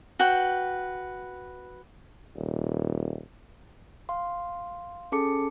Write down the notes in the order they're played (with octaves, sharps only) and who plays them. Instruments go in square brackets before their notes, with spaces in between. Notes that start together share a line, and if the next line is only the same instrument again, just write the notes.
[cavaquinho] F#4 B4 G5
[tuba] D#1
[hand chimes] F5 C6
C#4 G#4 A4 A5 D6 C#7